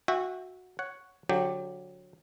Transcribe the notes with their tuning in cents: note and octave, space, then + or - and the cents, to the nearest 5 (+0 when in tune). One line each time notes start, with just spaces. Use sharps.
F#4 -15 E5 +0 G5 +30
C#5 +0 F#5 +0
D3 -15 F#3 -25 G4 +0